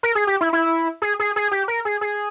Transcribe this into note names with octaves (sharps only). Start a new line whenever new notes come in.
A#4
G#4
G4
E4
E4
G#4
G#4
G#4
G4
A#4
G#4
G#4